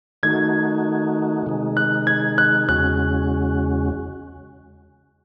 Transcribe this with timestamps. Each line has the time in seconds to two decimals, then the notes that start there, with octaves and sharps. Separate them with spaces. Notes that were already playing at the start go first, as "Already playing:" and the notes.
0.23 D#3 A3 D#4 F#4 G#6
1.46 C3 D#3 G#3 D#4
1.77 F#6
2.07 G#6
2.38 F#6
2.69 E2 C#3 G#3 C#4 F#4 F#6